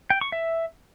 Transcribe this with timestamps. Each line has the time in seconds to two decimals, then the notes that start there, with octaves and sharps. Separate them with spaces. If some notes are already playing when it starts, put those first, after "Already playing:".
0.10 G5
0.21 C#6
0.32 E5